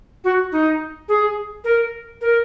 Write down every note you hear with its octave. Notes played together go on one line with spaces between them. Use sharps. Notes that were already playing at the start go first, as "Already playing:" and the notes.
F#4
D#4
G#4
A#4
A#4